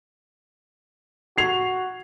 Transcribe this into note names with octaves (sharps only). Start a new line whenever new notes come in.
F#4 C7 F7